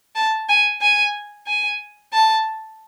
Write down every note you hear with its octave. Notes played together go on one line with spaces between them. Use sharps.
A5
G#5
G#5
G#5
A5